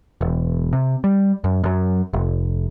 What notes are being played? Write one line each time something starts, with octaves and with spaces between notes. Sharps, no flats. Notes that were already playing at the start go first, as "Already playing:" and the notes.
E1
C3
G3
F#2
F#2 F#3
F1